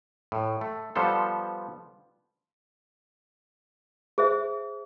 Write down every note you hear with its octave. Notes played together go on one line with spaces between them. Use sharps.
A2
A3
F3 G3 B3 A4 C5
G#4 C5 E5